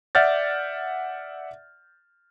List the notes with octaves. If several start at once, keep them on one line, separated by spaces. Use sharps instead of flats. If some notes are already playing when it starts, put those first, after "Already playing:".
D5 E5 F#5 F6 G6 A6